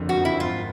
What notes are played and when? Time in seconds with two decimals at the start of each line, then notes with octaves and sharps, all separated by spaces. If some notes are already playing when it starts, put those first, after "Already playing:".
Already playing: F#1 F2 D3 F3
0.09 F#4
0.17 F3
0.25 E4
0.40 G#1 F4